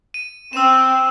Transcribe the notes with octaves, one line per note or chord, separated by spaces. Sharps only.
D#7
C4 E6 E7